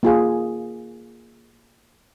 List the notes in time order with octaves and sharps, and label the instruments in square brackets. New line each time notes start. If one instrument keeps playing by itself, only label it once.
[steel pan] A#3 F4 G#4